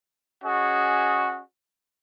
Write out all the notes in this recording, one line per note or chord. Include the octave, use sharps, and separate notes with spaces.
C#4 F#4 G#4 D#5